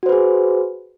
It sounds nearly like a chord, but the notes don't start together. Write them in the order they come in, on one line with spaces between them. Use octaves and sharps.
F#4 C5 B4 G#4